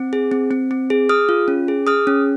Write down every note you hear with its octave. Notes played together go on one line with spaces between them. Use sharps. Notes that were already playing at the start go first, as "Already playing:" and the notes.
Already playing: C4
G#4
C4
C4
C4
G#4
G#4 D#6 F6
F4
C#4
G#4
G#4 D#6 F6
C#4